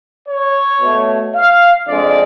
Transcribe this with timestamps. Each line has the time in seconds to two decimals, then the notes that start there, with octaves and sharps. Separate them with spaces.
0.29 C#5
0.81 B2 A3
1.36 F5
1.88 F2 D3 G#3 D5